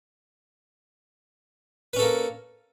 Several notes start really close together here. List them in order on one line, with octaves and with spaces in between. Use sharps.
B4 C#4 A4 A#3